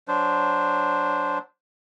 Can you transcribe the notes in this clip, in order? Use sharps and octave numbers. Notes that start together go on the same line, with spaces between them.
F#3 D4 C5